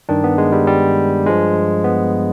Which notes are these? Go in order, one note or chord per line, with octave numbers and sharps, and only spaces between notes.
G2 D#3 D4
B3
G#3
G3
G3
G2 F3 G#3
B3